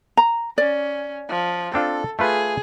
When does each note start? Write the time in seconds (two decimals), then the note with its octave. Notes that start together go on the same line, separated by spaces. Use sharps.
0.17 A#5
0.58 C#4 D5
1.29 F3
1.74 C4 D4 F4 A4
2.19 A3 F4 G#4 B4